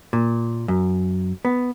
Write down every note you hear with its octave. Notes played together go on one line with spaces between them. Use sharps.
A#2
F#2
B3